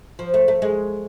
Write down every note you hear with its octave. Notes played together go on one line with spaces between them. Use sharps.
F3
A3
A3
G#3